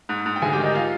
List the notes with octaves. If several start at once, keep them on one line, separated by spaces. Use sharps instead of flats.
G#2
G#2
G5
D2 G#4 G#5
G4 G5
D#3
D#4 D#5
F4 F5